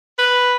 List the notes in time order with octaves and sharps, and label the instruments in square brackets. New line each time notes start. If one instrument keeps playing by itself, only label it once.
[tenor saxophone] B4